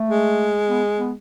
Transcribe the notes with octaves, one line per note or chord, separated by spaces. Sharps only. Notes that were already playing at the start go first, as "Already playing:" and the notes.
Already playing: A3
G#3
B3
B3